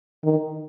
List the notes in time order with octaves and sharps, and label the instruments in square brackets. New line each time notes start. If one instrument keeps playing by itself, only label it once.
[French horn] D#3